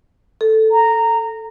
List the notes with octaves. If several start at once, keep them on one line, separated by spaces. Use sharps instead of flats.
A4
A#5